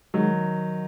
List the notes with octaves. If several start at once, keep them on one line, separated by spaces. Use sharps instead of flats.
D#3 F#3 G#3